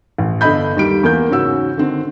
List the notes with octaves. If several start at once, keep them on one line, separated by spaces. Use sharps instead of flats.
A1
G1 D4 A4 D#5 B5 G6
D#2 G3 D7
E2 A#3 G6
G#2 C#3 C#4 F#4 E6
D3 D#3 C4